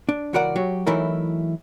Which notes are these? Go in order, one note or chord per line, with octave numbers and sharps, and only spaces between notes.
D4
C#2 E3 F#4 A#4 D5 F#5
F#3 F#4 G4
E3 F#3 A3 D#4 E4 A#4